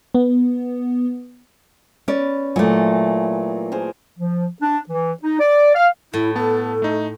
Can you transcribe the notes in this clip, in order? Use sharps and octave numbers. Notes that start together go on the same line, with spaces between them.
B3
C#4 B4 D5
A#2 E3 F#3 A3 D6
G#4 A#4 C5
F3
D4
E3
D#4
D5
F5
A2 E4
B3 A4 A5
A3 D#4